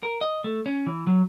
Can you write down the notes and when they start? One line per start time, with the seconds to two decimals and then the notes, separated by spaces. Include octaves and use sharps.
0.03 A#4
0.21 D#5
0.44 A3
0.66 C#4
0.87 E3
1.07 F#3